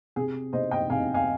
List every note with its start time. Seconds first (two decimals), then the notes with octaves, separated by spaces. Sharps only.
0.16 C3 G#4
0.53 C3 C5 D#5
0.71 D#5 G5
0.90 C3 F5 G#5
1.14 F5 G#5